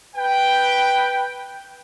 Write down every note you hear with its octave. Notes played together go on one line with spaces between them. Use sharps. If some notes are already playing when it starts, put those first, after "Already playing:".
B4 G5